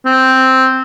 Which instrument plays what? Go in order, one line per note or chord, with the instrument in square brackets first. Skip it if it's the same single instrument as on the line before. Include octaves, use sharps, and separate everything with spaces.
[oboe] C4